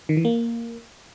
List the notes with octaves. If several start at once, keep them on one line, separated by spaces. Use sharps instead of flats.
D#3
E3
A#3